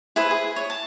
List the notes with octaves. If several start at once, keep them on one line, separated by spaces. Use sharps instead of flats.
E4 G#4 B4 C5
G#4
C#5
A5